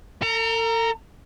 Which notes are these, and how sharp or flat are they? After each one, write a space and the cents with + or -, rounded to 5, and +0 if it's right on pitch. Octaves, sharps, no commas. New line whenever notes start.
A4 +45 A#5 +0